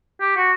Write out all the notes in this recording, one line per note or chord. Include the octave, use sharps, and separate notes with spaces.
G4
F#4